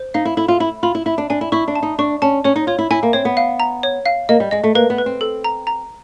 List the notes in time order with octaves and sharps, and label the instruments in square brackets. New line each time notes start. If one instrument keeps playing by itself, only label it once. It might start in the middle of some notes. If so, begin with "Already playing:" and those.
Already playing: [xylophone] C5
[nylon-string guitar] D#4 [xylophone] F5
[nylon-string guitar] E4
[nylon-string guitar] E4 [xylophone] A4
[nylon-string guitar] F4
[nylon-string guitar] E4 [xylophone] B5
[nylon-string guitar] F4 [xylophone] B5
[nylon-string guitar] E4
[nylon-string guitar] E4 [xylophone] E5
[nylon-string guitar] D4
[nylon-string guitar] D4 [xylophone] G#5
[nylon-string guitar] E4
[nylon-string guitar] E4 [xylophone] C#6
[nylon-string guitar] D4
[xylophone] A5
[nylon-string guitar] D#4
[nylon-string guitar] D4 [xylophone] C#6
[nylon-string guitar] C#4 [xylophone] A5
[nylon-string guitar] C#4 [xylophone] C#5
[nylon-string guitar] D#4
[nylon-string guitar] F4 [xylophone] C#5
[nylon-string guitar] E4
[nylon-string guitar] E4 [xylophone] G#5
[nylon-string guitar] A#3
[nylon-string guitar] C4 [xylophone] C#5
[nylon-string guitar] B3
[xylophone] F5
A#5
C#5
F5
[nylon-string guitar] A#3 [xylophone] D#5
[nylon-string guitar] G3
[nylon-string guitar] G#3 [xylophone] D#5
[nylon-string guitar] A3
[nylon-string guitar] A#3 [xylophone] B4
[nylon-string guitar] B3
[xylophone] B4
[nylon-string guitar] C4
[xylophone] A4
A#5
A#5